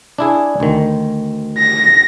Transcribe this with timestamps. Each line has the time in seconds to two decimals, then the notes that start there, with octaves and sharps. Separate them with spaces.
0.18 D4 E4 G#4
0.60 D2 D#3
1.59 A#6